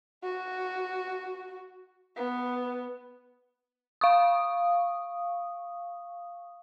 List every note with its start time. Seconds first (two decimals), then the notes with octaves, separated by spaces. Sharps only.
0.23 F#4
2.17 B3
4.01 F5 C#6 D#6